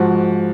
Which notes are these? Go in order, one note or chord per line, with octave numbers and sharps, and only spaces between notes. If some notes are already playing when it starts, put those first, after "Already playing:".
Already playing: G#2 F3 F#4